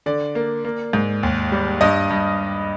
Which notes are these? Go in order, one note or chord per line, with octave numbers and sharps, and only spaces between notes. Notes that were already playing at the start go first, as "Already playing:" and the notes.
D3 D5
A#3
A#3
G#2
D#2
G3
G2 D#5
G2